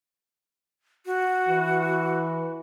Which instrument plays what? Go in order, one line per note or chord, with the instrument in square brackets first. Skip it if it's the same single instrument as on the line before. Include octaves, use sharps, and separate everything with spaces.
[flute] F#4
[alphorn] E3